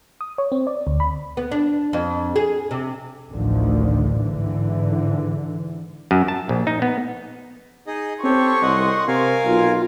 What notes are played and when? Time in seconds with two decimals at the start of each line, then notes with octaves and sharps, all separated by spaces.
0.21 D#6
0.38 C#5
0.52 C4
0.67 D5
0.87 D2
1.00 B5
1.37 B3
1.52 D4
1.93 F2
2.36 G#4
2.71 C3
3.31 A1 D2 D3 D#3 F3
4.19 G#2 D3 E3
6.11 F#2
6.28 A5
6.49 A#1
6.67 D#4
6.82 B3
7.87 D#4 G#4 D#5
8.24 C4 G4 A4 C#5 C6 C#6
8.62 C2 D#5 F#5
9.08 C3 A#4 F5 G#5
9.45 B1 F4